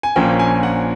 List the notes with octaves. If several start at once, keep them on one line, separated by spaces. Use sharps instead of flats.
G#5
A#1 A#2 F3 A#3 C#4 G5
G#5
F#5